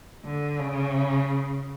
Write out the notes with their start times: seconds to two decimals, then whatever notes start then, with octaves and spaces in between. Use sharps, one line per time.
0.25 D3
0.59 C#3